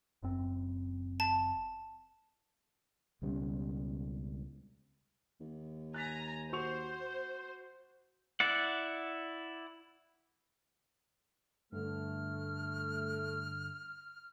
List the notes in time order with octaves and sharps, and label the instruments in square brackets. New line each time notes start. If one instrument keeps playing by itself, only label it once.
[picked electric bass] F#1 F#2 C4
[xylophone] A5
[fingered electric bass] C#2 B2 G3 C#4
[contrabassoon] D#2
[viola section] G#5 A#5 [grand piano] F#6 A6 B6
[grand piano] F#4 C#6 F7 [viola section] C5
[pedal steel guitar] E4 D5 F#5
[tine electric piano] G2 D3 [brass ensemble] A3 [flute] F6